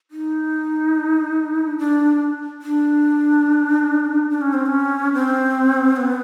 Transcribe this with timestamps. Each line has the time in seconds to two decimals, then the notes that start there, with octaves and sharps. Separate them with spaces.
0.11 D#4
1.78 D4
2.62 D4
4.30 D4
4.41 C#4
4.54 C4
4.66 C#4
5.13 C4
5.96 B3